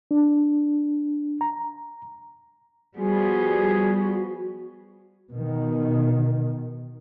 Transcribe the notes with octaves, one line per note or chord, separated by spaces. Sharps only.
D4
A#5
F3 G3 B3 F#4 G#4
B2 D#3